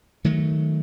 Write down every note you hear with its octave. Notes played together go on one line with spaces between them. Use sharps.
D#3 F#3 A3